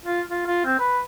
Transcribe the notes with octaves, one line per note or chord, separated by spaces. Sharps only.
F4
F4
F4
C4
B4